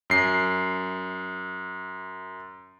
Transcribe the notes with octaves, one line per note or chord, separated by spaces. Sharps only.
F#2 C7